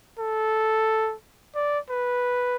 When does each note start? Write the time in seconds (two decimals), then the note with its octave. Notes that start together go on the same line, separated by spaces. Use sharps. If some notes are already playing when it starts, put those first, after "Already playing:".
0.19 A4
1.55 D5
1.89 B4